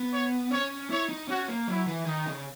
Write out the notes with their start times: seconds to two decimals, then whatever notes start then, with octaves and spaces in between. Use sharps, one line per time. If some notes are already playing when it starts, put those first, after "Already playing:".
Already playing: B3
0.11 C#5
0.51 C#4 C#5
0.90 E4 C#5
1.09 D#4
1.28 C#4 F#4
1.48 A#3
1.68 F#3 E4
1.87 E3
2.06 D#3 D#4
2.26 C#3